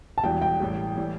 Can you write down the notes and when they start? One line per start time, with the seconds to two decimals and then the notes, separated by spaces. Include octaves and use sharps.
0.18 A5
0.23 E1 E2 E3 G3 G5
0.42 G5
0.60 A1 A2 G3
0.97 A2 E3 G3